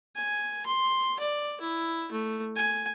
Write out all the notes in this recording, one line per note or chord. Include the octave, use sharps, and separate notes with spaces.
G#5
C6
D5
E4
A3
G#5